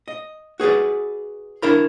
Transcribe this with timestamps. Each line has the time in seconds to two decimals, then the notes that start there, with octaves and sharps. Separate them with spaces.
0.08 D#5
0.60 F#4 G#4 B4 D5
1.62 D4 E4 A#4 B5